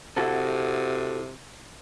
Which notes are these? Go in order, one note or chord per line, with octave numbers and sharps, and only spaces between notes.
C3 E4 F#4 A4